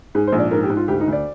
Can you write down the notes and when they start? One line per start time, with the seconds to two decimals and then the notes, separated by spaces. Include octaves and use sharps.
0.15 G#2 G#4
0.27 C5
0.32 A#1
0.39 D5
0.51 G#2 A#4
0.63 G4
0.70 G#2
0.77 F4
0.88 D2 G4
1.00 D#4
1.08 D2 D5